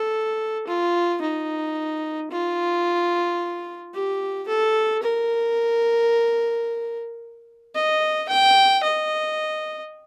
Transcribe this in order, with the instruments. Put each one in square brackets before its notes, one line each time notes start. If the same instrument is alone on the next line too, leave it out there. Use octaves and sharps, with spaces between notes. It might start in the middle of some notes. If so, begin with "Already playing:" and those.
Already playing: [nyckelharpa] A4
F4
D#4
F4
G4
A4
A#4
D#5
G5
D#5